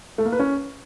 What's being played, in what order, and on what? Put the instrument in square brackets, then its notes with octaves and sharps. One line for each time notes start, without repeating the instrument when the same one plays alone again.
[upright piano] A3
A#3
B4
C#4